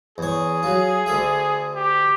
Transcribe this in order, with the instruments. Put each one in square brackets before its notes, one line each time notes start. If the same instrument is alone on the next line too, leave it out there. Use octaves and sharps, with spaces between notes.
[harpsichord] E2 C#5 [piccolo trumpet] G#4
[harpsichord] F#3 F4
D2 A4 E5
[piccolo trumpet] G4